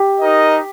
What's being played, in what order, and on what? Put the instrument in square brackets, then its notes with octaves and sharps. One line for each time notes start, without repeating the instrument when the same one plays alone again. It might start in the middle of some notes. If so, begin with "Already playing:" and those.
Already playing: [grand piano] G4
[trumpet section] D#4 A#4 D#5